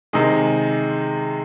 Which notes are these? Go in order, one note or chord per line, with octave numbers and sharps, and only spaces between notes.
C3 D#3 G#3 D#5